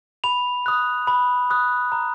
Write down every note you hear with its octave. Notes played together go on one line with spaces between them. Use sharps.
B5 F7
D#6 F#6
B5
D#6 F#6
A#5